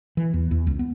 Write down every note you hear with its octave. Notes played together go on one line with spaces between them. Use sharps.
E3
E2
E2
C#2
B3